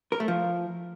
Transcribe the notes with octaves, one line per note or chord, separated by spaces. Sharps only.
A#4
A3
F3